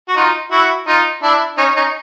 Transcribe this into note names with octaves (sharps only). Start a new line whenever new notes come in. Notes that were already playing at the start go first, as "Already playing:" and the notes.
F#4
D#4 F4
E4 F#4
D#4 F4
D4 E4
C#4 D#4
C#4 D#4